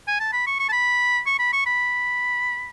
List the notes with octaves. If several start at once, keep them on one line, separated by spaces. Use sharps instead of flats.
G#5
A5
B5
C#6
C#6
A5
B5
C#6
B5
C#6
B5